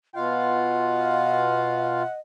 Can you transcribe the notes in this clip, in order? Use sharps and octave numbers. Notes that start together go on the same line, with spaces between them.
B2 F4 D#5 F5 F#5